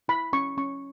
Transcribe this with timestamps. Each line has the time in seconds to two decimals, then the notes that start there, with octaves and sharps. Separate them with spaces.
0.08 E4 B5
0.33 C#4 C#6
0.58 C#4 C#6